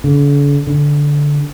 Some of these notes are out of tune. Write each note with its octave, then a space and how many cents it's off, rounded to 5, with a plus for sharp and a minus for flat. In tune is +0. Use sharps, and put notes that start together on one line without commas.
D3 -45
D3 -10